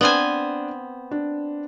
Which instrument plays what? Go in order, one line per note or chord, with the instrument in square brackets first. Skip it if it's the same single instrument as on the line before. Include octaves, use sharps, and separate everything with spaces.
[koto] B3 C4 G#5 [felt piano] D4 D5
[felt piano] D4